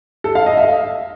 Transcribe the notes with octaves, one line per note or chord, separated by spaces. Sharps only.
A4
F5
D#5
E5